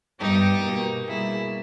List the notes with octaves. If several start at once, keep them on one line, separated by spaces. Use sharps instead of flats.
G2 G3 B3 D#4 G4
B2 A#3
B2 G3 A#3 E4 G#4